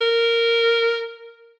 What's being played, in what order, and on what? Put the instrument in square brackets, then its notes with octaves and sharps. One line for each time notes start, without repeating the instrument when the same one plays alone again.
[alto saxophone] A#4